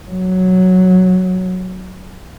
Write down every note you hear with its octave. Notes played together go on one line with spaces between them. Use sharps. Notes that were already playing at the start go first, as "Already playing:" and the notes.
F#3